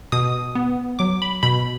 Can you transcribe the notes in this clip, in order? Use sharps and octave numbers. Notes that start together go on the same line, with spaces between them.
B2 D#6
B3
F#3 D6
B5
B2 B5